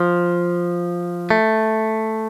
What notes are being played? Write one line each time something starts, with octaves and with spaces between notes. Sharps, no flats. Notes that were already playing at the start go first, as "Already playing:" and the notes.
Already playing: F3
A3